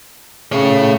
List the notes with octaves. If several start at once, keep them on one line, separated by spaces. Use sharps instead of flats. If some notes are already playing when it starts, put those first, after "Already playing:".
C#3 A3 C#5